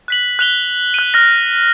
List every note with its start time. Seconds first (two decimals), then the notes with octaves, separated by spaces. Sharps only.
0.08 F#6 B6 F#7
0.39 F#6 F7 G7
0.94 F#6 D#7
1.14 F6 F#6 A#6